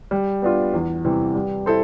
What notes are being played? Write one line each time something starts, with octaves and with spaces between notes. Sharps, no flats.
G3
B3 D4 F4
E2
C3 E3 G3 C4
G3
E4 A4 C5